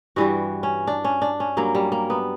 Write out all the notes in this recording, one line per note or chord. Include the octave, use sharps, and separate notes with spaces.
G2 E3 G3 F#4
C#4
D4
C#4
D4
C#4
G2 F#3 A#3
G3
A#3
B3